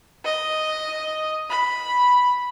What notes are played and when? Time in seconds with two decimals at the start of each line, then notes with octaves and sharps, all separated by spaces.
0.25 D#5
1.50 B5